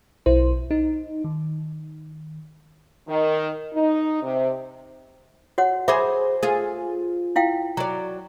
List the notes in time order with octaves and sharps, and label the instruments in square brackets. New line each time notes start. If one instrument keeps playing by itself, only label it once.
[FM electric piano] B1 E4 C5
D#4
D#3
[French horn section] D#3
D#4
C3
[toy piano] F#4 C#5 F#5
[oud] G#4 C5 [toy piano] E5 B5 D6
[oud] F4 G#4
[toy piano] E4 F5 G5
[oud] F#3 D5 [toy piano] A#5